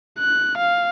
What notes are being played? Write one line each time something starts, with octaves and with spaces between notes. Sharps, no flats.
F#6
F5